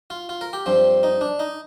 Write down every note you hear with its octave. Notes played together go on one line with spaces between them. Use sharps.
F4
F4
A#4
G4
G2 F3 C4
D#4
D4
D#4